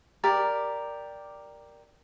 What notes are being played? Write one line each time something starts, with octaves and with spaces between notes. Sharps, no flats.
G4 A#4 D5